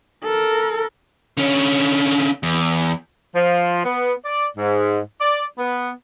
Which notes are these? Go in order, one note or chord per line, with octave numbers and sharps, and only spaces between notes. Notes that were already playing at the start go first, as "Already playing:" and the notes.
A4 A#4
D3 C#4
E2
F3
B3
D5
G#2
D5
B3